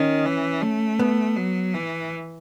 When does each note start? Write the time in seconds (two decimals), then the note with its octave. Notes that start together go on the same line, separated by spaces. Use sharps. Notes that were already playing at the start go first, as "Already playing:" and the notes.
Already playing: D#3 C#4
0.25 E3
0.62 A3
0.99 B3
1.37 F#3
1.74 E3